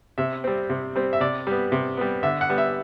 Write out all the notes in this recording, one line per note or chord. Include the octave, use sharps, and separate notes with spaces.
C3 E5
G3 C4
C3
G3 C4
E5
C3 D5
G3 B3
C3
G3 B3
D3 E5
F#5
G3 B3
E5